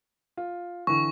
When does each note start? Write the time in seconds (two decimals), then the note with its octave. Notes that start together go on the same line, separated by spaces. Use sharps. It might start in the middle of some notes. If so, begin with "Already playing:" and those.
0.37 F4
0.87 D3 E3 C#6